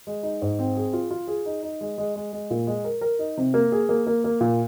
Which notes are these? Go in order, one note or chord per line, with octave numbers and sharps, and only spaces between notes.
G#3
D#4
G#2
C4
G#4
F4
F4
G#4
D#4
D#4
G#3
G#3
G#3
G#3
A#2
G#3
A#4
A#4
D#4
C3
A#3
G#4
A#3
A#3
A#3
A#2